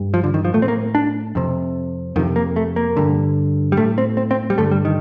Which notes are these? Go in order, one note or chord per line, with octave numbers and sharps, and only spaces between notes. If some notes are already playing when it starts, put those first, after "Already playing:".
Already playing: G2
F3
D3
D#3
F3
A2 A3
C4
A#3
D4
F2 C3
F2 C3 D#3
A#3
A3
A#3
G2 D3
G3
A2 A3
C4
C4
C4
G3
G2 D3 A3
G3
D#3